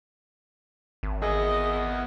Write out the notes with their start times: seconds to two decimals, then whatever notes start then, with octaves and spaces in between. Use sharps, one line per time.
1.03 G#1
1.22 B3 G#4 D#5 E5